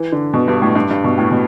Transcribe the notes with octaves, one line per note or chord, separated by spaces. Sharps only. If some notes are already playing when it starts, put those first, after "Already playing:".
Already playing: E3
D3
B2
G2
A2
G2
G2
B2
A2
B2